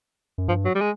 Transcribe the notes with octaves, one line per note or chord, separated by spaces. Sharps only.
F#2
G2 F3
F#3
G3
G#3